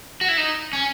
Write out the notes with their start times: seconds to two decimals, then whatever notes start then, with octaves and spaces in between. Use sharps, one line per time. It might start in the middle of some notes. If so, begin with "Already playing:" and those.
0.21 F#4
0.29 E4
0.38 D#4
0.73 C#4